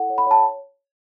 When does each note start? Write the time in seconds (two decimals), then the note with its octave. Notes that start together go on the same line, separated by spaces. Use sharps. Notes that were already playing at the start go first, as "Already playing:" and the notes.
Already playing: E4 A4 F#5
0.10 C#5
0.18 B5
0.27 C#5 A5